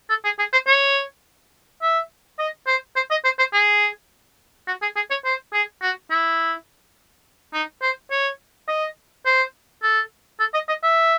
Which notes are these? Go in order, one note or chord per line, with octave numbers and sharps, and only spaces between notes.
A4
G#4
G#4
C5
C#5
E5
D#5
C5
C5
D#5
C5
C5
G#4
F#4
G#4
G#4
C#5
C5
G#4
F#4
E4
D#4
C5
C#5
D#5
C5
A4
A4
D#5
D#5
E5